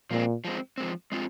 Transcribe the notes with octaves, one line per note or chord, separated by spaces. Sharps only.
A#2 F3 G#3 C4
F3 G#3 C4
F3 G#3 C4
G#3 C4 F4